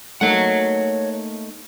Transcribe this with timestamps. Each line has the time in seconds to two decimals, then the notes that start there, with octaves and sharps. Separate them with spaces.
0.21 A3 A#3 D#4 C#5 F#5